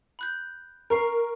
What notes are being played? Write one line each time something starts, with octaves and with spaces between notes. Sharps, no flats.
B5 F#6 G6
A#4 A#5 C#6 C7